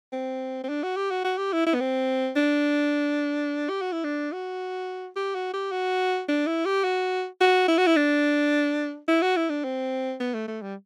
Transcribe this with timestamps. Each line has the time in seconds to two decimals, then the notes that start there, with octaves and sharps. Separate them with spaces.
0.13 C4
0.64 C4
0.69 D4
0.83 F#4
0.97 G4
1.11 F#4
1.25 F#4
1.38 G4
1.53 E4
1.66 E4
1.74 B3
1.80 C4
2.36 D4
3.69 G4
3.81 F#4
3.92 E4
4.04 D4
4.32 F#4
5.16 G4
5.35 F#4
5.54 G4
5.72 F#4
6.28 D4
6.47 E4
6.65 G4
6.84 F#4
7.41 F#4
7.68 E4
7.78 F#4
7.86 E4
7.96 D4
9.08 E4
9.22 F#4
9.36 E4
9.50 D4
9.64 C4
10.20 B3
10.34 A3
10.48 A3
10.62 G3